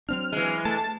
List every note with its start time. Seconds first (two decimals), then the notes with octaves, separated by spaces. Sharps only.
0.09 F#3 C4 D4 F6
0.32 E3 G#3
0.65 A3 A5